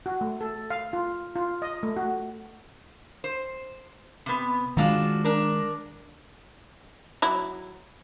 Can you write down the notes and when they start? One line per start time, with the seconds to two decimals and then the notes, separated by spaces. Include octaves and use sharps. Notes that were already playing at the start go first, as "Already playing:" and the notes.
0.06 F#4
0.21 A3
0.41 A4
0.71 F5
0.93 F4
1.36 F4
1.62 D#5
1.83 A3
1.96 F#4
3.24 C5
4.26 C3 B3
4.77 D#3 G#3 D4 F4 F#4
5.24 D4 A#4
7.22 F#3 E4